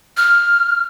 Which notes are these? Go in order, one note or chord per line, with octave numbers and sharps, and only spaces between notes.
F6